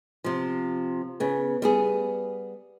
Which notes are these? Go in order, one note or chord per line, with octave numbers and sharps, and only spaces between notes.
C3 F3
C#3 B3
G3 B3 G#4